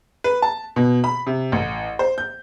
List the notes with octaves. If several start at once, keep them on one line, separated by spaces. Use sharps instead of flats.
B4
A5
B2
B5
C3
A1
C5
G6